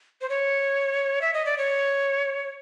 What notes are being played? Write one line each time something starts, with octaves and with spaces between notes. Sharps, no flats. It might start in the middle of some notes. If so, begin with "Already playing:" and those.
C5
C#5
E5
D#5
D5
C#5